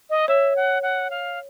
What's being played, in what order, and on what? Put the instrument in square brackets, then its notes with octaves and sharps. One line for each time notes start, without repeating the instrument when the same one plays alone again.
[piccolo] D#5
[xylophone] C#5 [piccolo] E5
[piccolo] F#5
F#5
F5